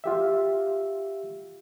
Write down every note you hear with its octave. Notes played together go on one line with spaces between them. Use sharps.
F4 G4 E5